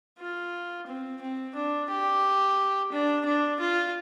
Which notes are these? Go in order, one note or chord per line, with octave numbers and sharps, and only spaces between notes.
F4
C4
C4
D4
G4
D4
D4
F4